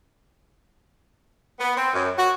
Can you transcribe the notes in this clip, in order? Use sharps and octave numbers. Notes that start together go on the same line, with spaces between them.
B3
C4
F#2
F#4